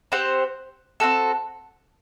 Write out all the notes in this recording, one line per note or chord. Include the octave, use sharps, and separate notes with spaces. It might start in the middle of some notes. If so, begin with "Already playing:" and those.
C4 G4 C5 F#5
C4 F#4 A4